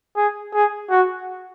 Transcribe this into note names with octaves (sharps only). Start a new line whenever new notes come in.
G#4
G#4
F#4